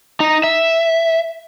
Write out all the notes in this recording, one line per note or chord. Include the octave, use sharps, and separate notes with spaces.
D#4
E5